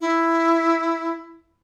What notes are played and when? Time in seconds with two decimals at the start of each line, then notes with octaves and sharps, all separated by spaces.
0.01 E4